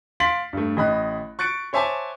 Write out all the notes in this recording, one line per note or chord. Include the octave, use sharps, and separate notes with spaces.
F5 C6 A6 B6 D7 F#7
G2 A3
A1 D#5 B5 F#6
C#6 F#6 A6 C#7 D7
C5 C#5 E5 G#5 A5 D6